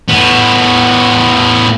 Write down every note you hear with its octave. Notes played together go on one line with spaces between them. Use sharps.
A2 B3